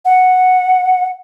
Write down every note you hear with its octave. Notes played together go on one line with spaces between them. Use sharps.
F#5